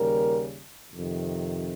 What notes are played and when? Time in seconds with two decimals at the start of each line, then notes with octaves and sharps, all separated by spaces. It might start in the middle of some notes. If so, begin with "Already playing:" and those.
Already playing: D#2 C#3 G3 A#4
0.90 F2 C3 D#3